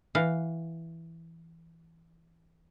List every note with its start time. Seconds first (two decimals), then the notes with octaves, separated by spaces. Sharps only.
0.15 E3 F5 F#5